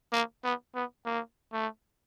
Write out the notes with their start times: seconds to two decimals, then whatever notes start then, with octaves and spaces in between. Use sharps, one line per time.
0.13 A#3
0.44 B3
0.75 B3
1.06 A#3
1.53 A3